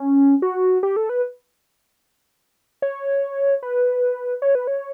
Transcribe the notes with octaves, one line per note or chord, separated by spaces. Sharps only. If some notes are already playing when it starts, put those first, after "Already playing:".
Already playing: C#4
F#4
G4
A4
B4
C#5
B4
C#5
B4
C#5